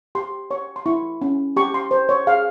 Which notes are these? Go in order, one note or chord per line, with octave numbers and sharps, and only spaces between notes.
G4 C6
C#5 C#6
C6
E4 C#6
C#4
G4 C#6
C6
C5
C#5
G#4 F5